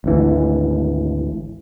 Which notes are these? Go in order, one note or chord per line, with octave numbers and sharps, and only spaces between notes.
G#1 D2 E3